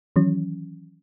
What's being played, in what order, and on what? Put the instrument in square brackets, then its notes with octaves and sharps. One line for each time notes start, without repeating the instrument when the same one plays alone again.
[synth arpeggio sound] D#3 E3 F#3 C#4